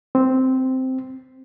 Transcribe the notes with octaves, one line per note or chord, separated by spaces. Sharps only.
C4